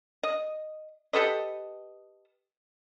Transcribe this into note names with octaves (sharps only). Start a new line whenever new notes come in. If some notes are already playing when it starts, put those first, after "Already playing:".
D#5
G4 A4 B4 D#5